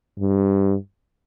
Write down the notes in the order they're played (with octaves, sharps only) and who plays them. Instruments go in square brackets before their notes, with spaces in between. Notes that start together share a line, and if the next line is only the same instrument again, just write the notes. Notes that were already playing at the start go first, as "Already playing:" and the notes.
[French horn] G2